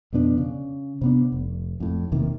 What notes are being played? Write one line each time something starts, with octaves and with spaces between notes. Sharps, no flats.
F2 B2 B3 D4
C#3
C3 B3 D4
F1
F2 A2
E1 C3 D#3 A#3